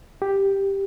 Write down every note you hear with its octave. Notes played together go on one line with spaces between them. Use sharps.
G4